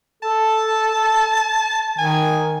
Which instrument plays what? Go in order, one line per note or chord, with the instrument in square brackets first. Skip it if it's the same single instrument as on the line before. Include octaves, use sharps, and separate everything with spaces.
[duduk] A4 [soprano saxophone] A5
[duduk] D#3 [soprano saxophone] G#5